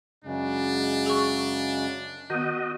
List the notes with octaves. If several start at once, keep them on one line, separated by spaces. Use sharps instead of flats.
F#2 C#3 G#3 D4
G#4 C#6
D#3 B3 F#4 D#5